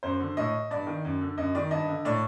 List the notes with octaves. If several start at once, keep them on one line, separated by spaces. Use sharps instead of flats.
F#2 C5
D3
A2 D#5
G2 D5
D#3
F#2
D3
F#2 D#5
D#3 D5
G2 D#5
D3
A2 D5